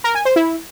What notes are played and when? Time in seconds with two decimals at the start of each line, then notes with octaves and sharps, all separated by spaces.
0.04 A#4
0.15 G#5
0.25 C5
0.36 E4